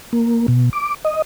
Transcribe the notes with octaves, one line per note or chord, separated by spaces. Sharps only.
A#3
B2
D6
D#5